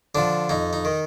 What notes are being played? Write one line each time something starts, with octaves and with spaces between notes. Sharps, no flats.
D3 F3 D4
F2 D#4
D#4
D#3